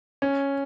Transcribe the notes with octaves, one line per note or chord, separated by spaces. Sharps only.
C#4